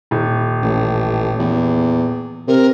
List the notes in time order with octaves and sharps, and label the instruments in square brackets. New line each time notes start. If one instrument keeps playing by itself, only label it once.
[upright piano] D#1
[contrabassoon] A1
E2
[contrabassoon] C3 [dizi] A#4